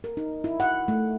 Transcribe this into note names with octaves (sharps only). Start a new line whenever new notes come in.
A#4
D#4
E4
F#5
A3